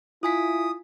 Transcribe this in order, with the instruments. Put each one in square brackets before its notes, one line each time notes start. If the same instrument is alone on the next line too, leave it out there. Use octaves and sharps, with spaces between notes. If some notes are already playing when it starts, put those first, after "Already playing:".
[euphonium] E4 [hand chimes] F4 G#5 B6 [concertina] D#6